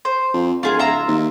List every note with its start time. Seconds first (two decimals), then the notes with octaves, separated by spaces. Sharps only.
0.05 C5
0.34 F2
0.63 D1 F4 G#4 A#4
0.79 F4 E5 A#5
1.08 D#2